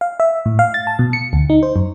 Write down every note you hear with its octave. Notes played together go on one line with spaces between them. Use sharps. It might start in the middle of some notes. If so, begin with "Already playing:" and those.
F5
E5
A2
F5
A6
A5
B2
C#7
D2
D#4
C5
F#2